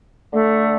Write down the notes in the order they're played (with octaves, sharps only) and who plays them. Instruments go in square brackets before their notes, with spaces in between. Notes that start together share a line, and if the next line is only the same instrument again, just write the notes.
[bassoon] D3 [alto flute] A3